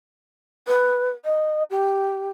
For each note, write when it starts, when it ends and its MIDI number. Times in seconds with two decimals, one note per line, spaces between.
0.68 1.10 71
1.25 1.63 75
1.70 2.30 67